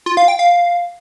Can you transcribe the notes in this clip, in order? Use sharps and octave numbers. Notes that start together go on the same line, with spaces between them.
F4
F5
G5
F5